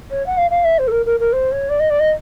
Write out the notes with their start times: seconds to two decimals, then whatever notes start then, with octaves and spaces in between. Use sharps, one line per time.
0.10 C#5
0.26 F#5
0.37 F5
0.50 F5
0.64 E5
0.78 C5
0.87 A4
0.91 A#4
1.05 A#4
1.19 A#4
1.32 C5
1.51 C#5
1.69 D5
1.79 D#5
1.90 D5
1.99 D#5